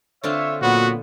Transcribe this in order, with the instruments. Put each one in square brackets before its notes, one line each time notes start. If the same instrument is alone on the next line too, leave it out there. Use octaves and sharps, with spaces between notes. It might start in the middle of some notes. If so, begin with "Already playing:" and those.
[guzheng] D3 C4 F4 [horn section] C#5 E5
[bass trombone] A#2 [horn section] F#3 B3 [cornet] F#4